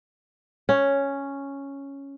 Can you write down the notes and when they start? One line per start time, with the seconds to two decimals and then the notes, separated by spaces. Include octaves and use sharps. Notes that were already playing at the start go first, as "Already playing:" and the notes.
0.69 C#4